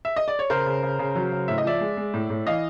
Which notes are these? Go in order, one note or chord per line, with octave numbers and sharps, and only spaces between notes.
E5
D#5
D5
C#5
C#3 A#4 C5
C#3
C#3
C#3
F#3
C#3
A2 E5
D#5
F3 D5 E5
G#3
G#3
A2
A2
E3 D#5 F5